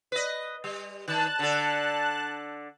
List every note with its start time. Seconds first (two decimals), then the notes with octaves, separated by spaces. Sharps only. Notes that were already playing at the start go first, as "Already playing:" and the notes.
0.12 B4 D#5
0.64 G3
1.08 D#3 A5 F#6
1.39 D3 A4